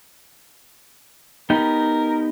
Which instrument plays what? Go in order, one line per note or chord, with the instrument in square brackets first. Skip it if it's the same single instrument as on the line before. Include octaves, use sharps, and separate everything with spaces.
[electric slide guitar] B3 D#4 G4 [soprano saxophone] A#4